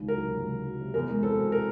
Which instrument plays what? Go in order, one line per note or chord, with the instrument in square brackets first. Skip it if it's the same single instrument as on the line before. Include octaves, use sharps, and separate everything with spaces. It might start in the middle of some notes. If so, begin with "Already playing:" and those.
Already playing: [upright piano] C#2 D#3
[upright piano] F#3 [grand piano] A#4
[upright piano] C3
C#2
D#3
F#3
C3
[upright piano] E2 [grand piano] A#4
[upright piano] G#3
[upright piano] C4 [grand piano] A4
[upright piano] B2
[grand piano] A#4